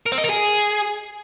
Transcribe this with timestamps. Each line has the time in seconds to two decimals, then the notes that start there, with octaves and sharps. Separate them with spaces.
0.06 A#4
0.12 C4
0.18 D#5
0.24 A#4
0.30 G#4